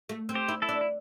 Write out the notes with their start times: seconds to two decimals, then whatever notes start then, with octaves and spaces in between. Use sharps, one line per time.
0.09 A3
0.29 C4
0.35 G4 C5
0.48 E4
0.62 E4 A4
0.69 D4
0.81 E4